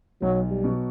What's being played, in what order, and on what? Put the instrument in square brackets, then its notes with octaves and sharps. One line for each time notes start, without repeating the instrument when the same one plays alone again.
[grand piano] B1 [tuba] F#3
[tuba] G3
[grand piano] B2 F#3